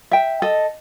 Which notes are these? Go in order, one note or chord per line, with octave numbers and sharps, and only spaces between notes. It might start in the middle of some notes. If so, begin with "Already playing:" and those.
E5 G5
A4 D#5